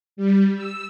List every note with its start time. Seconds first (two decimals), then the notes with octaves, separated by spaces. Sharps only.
0.17 G3
0.55 E6